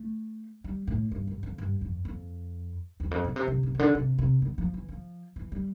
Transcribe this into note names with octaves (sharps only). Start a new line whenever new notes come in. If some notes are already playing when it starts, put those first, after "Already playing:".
Already playing: A3
G3
A2
G2
G2
F2
G2
F2
F2
E2
F2
B2
C3
C3
C3
C3
D3
C3
C3
D3
F3
E3
F3
E3
G3